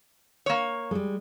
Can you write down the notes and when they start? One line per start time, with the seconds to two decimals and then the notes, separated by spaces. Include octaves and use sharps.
0.46 A#3 C#5
0.91 G3 G#3